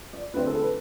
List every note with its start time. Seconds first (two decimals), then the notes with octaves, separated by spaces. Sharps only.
0.13 D5
0.34 D3 A3 C4 B4
0.47 A4
0.61 B4